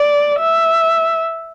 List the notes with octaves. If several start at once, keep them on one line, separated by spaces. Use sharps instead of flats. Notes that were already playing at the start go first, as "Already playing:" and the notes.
Already playing: D5
E5